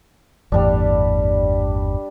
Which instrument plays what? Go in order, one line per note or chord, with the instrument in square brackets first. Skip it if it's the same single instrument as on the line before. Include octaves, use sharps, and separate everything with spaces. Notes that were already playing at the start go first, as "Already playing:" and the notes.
[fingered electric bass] G1 E2 A2 [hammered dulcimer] G3 D4